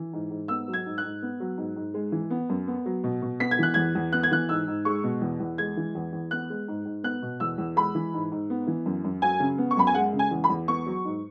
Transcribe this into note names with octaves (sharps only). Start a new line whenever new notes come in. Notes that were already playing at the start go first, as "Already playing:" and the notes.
Already playing: E3
G#2
G#2
B3 E6
F#3
G#6
G#2
F#6
G#2
B3
F#3
G#2
G#2
G#3
E3
B3
F#2
B3
F#3
B2
B2
B3 B6
G#6
E3 F#6
E2 G#6
E2
B3 F#6
G#6
E3 F#6
G#2 E6
G#2
G#3 C#6
B2
E2
E2
G#3 G#6
E3
E2
E2
B3 F#6
G#3
G#2
G#2
B3 F#6
B2
E2 E6
E2
G#3 B5
E3
G#2
G#2
B3
E3
F#2
F#2
F#3 G#5
C#3
B3
C#6
F#2 B5
G#5
G#3 F#5
C#3
G#5
E2
B5
E2
B3 C#6
F#3
G#2